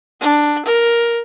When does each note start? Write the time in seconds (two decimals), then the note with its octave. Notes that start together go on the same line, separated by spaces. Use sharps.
0.21 D4
0.66 A#4